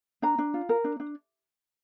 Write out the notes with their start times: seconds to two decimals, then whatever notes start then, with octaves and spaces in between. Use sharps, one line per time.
0.22 D4 A#5
0.38 D4
0.54 F4
0.69 A#4
0.84 D4
1.00 D4